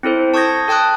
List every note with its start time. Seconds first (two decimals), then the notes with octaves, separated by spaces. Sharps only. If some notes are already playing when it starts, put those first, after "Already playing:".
0.03 C4 E4 A4 C5
0.34 A5 C#6 D#6 G6 G#6 A#6
0.68 A4 G5 A5 D#6 F#6